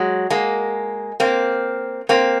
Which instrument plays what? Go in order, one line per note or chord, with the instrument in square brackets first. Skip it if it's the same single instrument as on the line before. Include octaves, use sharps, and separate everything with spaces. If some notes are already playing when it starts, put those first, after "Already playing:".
Already playing: [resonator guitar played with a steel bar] F#3 G#3
G#3 A#3
A#3 C4
A#3 C4